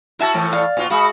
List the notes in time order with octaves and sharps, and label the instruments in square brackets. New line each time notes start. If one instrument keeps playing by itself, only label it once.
[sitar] E4 F#4 [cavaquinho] A#4 E5 A5
[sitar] A2 E3 A3
[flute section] D5 [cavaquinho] F5
[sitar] A#2 F4 F#4
[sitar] G#3 F#4 [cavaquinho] F5 [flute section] B5 D#6